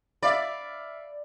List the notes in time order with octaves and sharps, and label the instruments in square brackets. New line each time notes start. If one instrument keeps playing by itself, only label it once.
[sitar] D5 [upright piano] E5 F5 B5